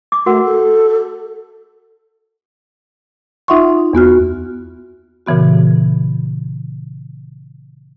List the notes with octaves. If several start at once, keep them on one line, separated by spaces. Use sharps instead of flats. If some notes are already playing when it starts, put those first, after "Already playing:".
D6
A3 F#4 A#4 F#5
A4
D#4 F4 E5 F#5 C6 C#6
E2 B3 F#4 F6
A#2 C#3 E3 B3 F#4